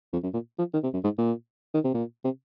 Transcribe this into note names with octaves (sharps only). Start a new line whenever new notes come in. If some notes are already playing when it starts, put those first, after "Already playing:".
F2
F#2
A#2
F3
D#3
C3
F#2
G#2
A#2
D#3
C3
A#2
C3